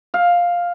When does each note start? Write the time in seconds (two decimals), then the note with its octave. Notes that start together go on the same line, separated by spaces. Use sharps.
0.14 F5